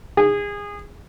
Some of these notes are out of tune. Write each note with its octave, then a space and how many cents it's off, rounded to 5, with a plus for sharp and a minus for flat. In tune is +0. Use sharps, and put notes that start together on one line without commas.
G#4 -25